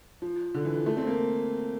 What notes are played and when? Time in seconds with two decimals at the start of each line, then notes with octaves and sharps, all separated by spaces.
0.22 F3
0.54 D3
0.65 E3
0.75 F3
0.86 A3
0.97 C4
1.07 A#3